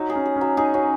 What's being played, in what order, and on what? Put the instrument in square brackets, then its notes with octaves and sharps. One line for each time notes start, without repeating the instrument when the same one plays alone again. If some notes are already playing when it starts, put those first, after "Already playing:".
Already playing: [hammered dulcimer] F#3 [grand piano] D#4
[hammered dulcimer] G#4
[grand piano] C#4
[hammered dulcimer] G#4
[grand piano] C#4
[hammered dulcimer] F#3
[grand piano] D#4 [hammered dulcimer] G#4
[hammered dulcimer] C#4 [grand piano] F#4